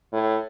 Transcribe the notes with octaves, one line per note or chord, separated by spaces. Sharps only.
A2